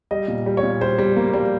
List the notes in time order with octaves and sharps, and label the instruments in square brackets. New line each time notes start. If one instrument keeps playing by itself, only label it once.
[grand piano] G3 D#5
A#2
G3
C#5
A#2
G3 C5
G3
A#3
G3